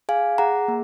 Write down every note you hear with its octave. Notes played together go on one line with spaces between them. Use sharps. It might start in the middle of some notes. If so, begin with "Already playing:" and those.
G#4 F5 G#5
G#4 F#5 A#5
A#3